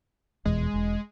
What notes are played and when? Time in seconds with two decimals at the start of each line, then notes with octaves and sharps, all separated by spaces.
0.45 F1 E2 B2 G#3
0.74 E1